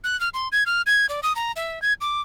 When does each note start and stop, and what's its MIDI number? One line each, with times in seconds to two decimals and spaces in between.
0.04 0.18 90
0.20 0.29 89
0.34 0.48 84
0.52 0.64 92
0.66 0.82 89
0.86 1.06 92
1.09 1.20 74
1.23 1.33 87
1.36 1.52 82
1.56 1.82 76
1.82 1.93 92
2.01 2.21 86